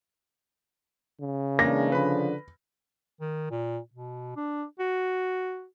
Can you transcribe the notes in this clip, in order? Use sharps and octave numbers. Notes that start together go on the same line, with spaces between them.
C#3
E3 G#3 A#3 D4 A#6
D3 F3 D4 B4 B5
D#3
A#2
B2
D4
F#4